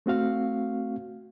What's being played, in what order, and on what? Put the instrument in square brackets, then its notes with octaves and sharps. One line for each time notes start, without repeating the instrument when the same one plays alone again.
[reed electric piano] A3 C4 F#4 F5